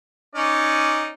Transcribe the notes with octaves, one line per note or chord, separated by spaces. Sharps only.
C#4 D#4 D5